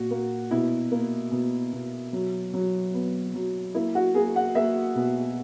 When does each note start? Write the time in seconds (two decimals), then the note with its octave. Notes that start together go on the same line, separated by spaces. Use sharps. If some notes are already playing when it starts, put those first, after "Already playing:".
Already playing: A#2 F#4
0.11 A#3
0.51 B2 E4
0.92 A#3
1.32 B2
1.73 B2
2.13 F#3
2.54 F#3
2.94 B3
3.35 F#3
3.75 A#3 E4
3.95 F#4
4.15 A#3 G#4
4.36 F#5
4.55 A#3 E5
4.96 B2